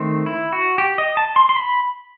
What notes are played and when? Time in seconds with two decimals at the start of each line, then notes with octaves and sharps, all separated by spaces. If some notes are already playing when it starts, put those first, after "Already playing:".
Already playing: D#3 A3 C4
0.26 E4
0.53 F#4
0.78 G4
0.98 D#5
1.17 A5
1.36 C6
1.49 C6
1.56 B5